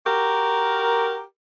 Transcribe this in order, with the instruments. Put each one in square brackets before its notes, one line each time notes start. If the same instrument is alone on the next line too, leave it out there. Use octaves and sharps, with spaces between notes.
[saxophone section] F#4 G4 A#4